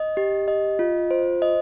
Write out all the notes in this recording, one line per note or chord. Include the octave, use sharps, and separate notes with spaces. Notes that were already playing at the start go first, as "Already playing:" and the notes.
Already playing: D#5
G4
D#5
F4
C5
D#5